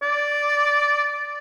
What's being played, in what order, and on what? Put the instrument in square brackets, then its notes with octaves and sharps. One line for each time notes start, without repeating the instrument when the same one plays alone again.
[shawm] D5